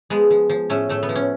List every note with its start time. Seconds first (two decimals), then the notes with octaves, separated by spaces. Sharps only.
0.10 F3 G#3 B3
0.30 F3
0.49 F3
0.70 A2 A3 C#4
0.89 A2 A3
1.03 B3
1.09 F3
1.15 C#4